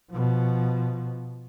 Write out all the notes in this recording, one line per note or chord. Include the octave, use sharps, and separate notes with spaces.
B2 F3